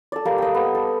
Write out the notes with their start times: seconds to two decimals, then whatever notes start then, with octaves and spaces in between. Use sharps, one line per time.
0.12 A4 D5
0.25 G3 A#3 A4
0.38 D#5 G5
0.55 B3
0.75 A4